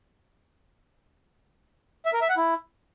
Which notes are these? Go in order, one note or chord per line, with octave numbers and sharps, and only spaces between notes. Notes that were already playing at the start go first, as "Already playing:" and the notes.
E5
A#4
E5
F#5
E4